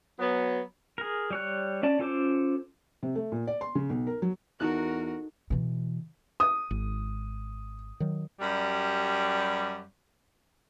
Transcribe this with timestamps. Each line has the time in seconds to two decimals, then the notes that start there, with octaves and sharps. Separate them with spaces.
0.19 F#3 B3
0.98 G#4 A#4
1.31 G3 C#5 F#6
1.83 C#4 D5 A5
1.99 C#4 F4 A4 C5 D6
3.03 C3
3.15 A3
3.32 A#2
3.47 D5
3.61 C6
3.75 C#3
3.90 B1
4.07 A#4
4.22 F#3
4.60 E2 D#4 F#4 A4 A#4 F#6
5.50 B2 E3
6.40 D#6
6.71 G#1
8.00 D#3 F#3
8.39 F#2 G3